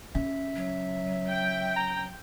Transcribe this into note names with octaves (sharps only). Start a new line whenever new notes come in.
C#3 E5
F#3
G5
A#5